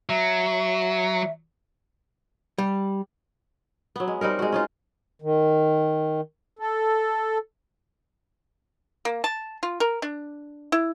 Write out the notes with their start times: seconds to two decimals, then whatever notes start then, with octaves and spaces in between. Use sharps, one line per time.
0.09 F#3 E5
2.58 G3
3.96 F#3 B3
4.08 G#3
4.21 G3 C4 D#4 A#4
4.39 G#3 F#4
4.52 C#4 D#4 F4
5.22 D#3
6.59 A4
9.05 A#3
9.24 A5
9.63 F4
9.80 A#4
10.02 D4
10.72 E4